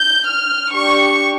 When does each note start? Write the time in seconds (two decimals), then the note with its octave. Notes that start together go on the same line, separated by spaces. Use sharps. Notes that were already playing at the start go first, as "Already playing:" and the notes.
Already playing: G6
0.27 F6
0.72 D4 G4 C#6